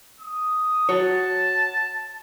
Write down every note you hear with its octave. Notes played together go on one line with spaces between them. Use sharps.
D#6
F#4 C#5 A5